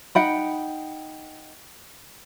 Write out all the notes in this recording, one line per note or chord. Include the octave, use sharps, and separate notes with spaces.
D#4 F#5 G5 B5